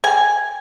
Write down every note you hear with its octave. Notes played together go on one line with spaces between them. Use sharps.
G#5